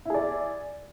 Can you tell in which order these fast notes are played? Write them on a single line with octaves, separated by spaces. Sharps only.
E4 G#4 D5